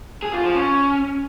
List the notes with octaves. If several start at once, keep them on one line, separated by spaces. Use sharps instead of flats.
G#4
F4
F3
C#4